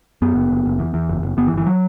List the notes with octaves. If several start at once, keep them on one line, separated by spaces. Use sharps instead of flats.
F#2 B3
F#1
F#1
F#1
E2
E2
F#1
F#1
G1 B3
E3
G1
E3
F#3